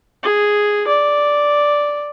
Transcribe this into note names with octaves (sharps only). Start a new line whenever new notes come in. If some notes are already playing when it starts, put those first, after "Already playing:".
G#4
D5